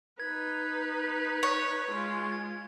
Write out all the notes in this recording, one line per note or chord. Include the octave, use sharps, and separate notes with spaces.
D#4 B4 G#6
C#5
G#3 F4